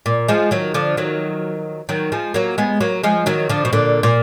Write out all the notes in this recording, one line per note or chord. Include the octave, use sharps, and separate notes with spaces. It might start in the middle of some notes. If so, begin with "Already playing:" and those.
A#2
F3 G#3
D#3 F#3
D3 F3
D#3 F#3
D#3 F#3
F3 G#3
F#3 A#3
G#3 B3
F#3 A#3
F3 G#3
D#3 F#3
D3 F3
B2
A#2 D3
A#2